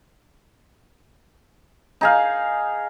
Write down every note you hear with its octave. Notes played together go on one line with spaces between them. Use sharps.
D#4 G#4 F5